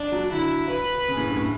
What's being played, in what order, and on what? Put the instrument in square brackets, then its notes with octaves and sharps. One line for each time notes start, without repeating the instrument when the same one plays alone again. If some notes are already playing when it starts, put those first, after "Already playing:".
Already playing: [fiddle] D4
[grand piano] F#3
[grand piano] D3 [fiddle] E4
[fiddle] B4
[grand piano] C#3
A2
G2
A2